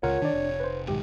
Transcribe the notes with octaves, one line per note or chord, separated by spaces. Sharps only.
C#2 F4 A#4 C#5 F#5
D#3 D4 D5
F1
B4 C5
B1 G#2 D#3 G4